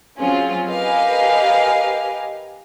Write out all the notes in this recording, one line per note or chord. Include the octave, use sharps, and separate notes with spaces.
F#3 C4 C#4 F4 G#4
G4 A#4 B4 D#5 F5 G#5